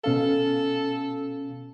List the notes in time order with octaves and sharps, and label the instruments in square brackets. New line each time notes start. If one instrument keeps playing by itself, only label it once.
[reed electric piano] B2 C#4 F5 [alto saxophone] A4